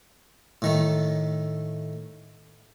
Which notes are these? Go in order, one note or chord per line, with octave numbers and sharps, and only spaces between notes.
A2 D#3 A3